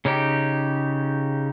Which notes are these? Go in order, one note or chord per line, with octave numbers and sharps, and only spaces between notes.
C#3 C#4 D#4 G4